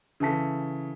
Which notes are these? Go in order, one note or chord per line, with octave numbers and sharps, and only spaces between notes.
C#3 E3 A4 B6